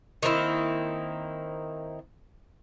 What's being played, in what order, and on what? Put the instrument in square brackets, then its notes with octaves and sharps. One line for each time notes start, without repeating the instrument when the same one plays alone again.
[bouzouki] D#3 A#3 C4 E4